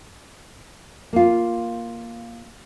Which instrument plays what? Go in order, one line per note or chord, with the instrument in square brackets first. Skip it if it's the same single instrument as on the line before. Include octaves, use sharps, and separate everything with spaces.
[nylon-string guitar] A#3 F4